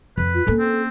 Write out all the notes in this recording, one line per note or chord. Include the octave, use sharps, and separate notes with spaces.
F2 B4
F4
A#3 C#4 A4
C4